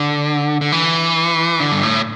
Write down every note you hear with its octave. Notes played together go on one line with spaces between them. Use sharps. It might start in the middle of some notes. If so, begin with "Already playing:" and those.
Already playing: D3
D3
E3
D3
G2
A2